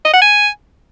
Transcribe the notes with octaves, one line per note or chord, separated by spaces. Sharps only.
D#5
F#5
G#5